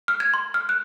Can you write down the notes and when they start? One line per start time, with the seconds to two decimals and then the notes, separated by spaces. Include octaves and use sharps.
0.08 F6
0.20 G#6
0.34 C6
0.54 F6
0.69 F#6